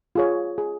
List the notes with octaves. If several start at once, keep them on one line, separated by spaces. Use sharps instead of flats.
F4 G#4 C#5
G#4